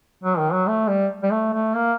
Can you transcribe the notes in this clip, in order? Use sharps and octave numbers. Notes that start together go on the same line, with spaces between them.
F#3
D#3
F#3
A3
G3
G3
A3
A3
A#3